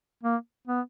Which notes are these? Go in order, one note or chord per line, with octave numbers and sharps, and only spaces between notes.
A#3
B3